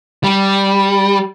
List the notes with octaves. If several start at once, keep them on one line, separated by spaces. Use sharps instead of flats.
G3